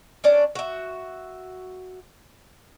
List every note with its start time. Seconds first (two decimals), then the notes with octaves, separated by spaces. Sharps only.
0.24 C#4 D4 D5
0.55 F#4 E5